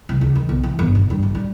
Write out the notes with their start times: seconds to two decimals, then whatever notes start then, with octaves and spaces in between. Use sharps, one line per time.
0.09 C2
0.21 C#2
0.35 D#3
0.49 B1
0.63 E3
0.79 G1
0.95 B2
1.10 G2
1.23 A1
1.35 G3